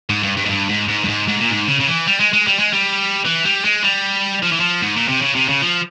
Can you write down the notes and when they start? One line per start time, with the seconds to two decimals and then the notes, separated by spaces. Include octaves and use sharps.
0.10 G#2
0.23 G2
0.37 G2
0.45 G#2
0.49 G2
0.69 G#2
0.89 G#2
1.04 G2
1.08 G#2
1.28 G#2
1.40 A#2
1.50 G#2
1.68 C#3
1.80 C#3
1.88 E3
2.07 G3
2.20 G#3
2.33 G#3
2.47 G3
2.59 G#3
2.73 G3
3.25 E3
3.45 G3
3.65 G#3
3.84 G3
4.43 F3
4.52 E3
4.60 F3
4.83 G#2
4.96 A#2
5.08 C3
5.22 C#3
5.35 C3
5.49 C#3
5.62 F3